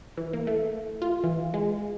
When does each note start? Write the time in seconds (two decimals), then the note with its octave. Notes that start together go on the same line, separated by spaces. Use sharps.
0.17 E3
0.33 A#3
0.47 A3
1.02 F4
1.24 E3
1.54 G#3